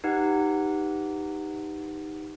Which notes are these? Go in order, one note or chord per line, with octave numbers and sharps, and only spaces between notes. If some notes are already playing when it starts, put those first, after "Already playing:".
D#4 G4 B4 F#5